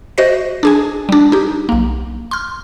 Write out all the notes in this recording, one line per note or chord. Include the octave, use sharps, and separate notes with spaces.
F#4 C5 D#5 E5 A#6
D4 G#4 G#5
G3 D4
D#4 G4
B1 A#3
C6 F6